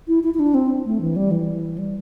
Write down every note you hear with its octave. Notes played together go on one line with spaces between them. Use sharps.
E4
E4
E4
D4
C4
A3
E3
G3
E3
G3